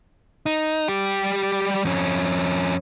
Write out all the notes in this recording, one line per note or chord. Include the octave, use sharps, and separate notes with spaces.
D#4
G3 G4
F2 C#4